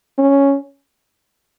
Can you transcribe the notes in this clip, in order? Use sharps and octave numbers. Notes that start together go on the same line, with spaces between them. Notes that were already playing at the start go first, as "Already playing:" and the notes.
C#4